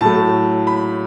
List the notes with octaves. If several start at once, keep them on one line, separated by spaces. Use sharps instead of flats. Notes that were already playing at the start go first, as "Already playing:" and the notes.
A2 F#3 A3 A5
B5